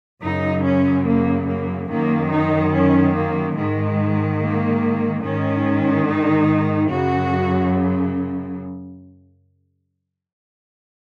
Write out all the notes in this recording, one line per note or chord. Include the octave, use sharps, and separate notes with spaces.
F#2 C#3 D#4
C#4
A#3
A#3
F#2 D#3 A#3
D#4
C#4
A#3
G#2 D#3 G#3
A#3
G#2 D#3 C#4
D#4
F#2 C#3 F#4